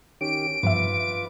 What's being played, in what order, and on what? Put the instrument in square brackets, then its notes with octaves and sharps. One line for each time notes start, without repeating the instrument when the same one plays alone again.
[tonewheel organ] D#3 C#4 G4 [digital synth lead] D7
[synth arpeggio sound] G2 F3 E5 [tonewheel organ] F4 B4 D6